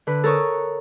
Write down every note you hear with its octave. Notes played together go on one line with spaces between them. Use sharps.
D3 B4
A4 A#4 C#5 C#6 D#6